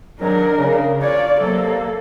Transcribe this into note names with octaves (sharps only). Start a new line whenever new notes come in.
G#2 D#3 F#3 D4 A#4
C#3
D4 F4 C#5 D5
C3 F#3 A#3 A4